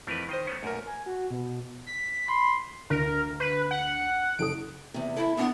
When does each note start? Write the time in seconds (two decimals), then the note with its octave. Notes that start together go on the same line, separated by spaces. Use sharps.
0.07 F2 E3 A3 A#4 B4
0.29 D#3 C5 D#5 C7
0.47 A3 B3 C#4
0.63 B1 F#2 A#2 A3 A#4
0.87 G#5
1.06 F#4
1.31 B2
1.86 B6
2.28 B5 C6
2.90 D2 A#4
3.40 B4
3.71 F#5
4.39 F#1 A4 D#6 D7
4.94 E2 C3
5.17 E4 A4 E5
5.37 E2 B3 D4 F#5